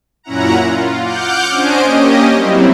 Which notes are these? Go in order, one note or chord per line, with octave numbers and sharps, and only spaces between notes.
F#2 A#2 C#4 E4 F#5 A#5
F4
F#5 D6 F6 G6
C#4 D4 C5 D#5 G#5 D7
A#3 C#4 G4 D#5
F#3 G3 C4 E4